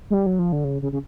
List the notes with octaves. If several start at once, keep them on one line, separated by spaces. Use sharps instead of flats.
G#3
G3
F#3
F3
D3
C#3
C#3
C#3